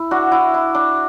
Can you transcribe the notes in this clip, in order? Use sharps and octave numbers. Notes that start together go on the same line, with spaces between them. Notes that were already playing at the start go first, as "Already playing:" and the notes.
Already playing: E4
D4 F#4
E4
E4
D4